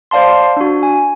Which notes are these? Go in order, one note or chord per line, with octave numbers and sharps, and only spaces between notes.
C5 D5 F5 A5 C6
D4 F#4
G#5